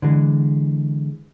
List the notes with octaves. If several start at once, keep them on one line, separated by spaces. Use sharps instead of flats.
D3 E3 G#3